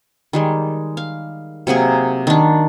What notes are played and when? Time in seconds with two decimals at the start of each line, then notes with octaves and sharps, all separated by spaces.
0.33 D#3 G3 G#3
0.97 F5
1.67 C3 F#3 A#3 G#4
2.27 D#3 D4